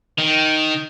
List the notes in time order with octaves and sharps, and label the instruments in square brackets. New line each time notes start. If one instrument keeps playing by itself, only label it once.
[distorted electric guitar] D#3